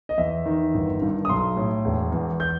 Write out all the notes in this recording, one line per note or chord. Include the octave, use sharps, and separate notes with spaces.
D#5
E2 E5
D#3
G1
G2
D#6
B1 C6
A2
E1
E2
G6